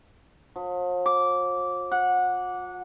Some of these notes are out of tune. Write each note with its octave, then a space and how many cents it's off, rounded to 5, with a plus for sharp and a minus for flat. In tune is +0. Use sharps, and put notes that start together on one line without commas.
F3 +45
D6 -15
F#5 -20